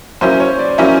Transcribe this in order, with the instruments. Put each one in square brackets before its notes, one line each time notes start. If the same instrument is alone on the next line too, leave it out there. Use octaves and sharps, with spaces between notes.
[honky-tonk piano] F#3 A#3 C#4 E4 [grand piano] C5
[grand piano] C#5
D5
[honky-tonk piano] F#3 A#3 C#4 E4